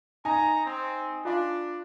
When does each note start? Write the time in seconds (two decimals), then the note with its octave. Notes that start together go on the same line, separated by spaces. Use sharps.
0.25 D#4 G#5 A#5
0.65 C4
1.25 D4 F4 F5 C6